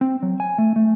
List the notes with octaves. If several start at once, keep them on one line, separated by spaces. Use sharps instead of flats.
C4
F#3
G#5
A3
A3